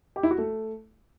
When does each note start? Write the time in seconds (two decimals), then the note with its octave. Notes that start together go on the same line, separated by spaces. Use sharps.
0.16 G4
0.23 E4
0.31 F#4
0.38 A3